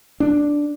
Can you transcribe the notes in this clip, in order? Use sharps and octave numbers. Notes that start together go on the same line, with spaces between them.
D4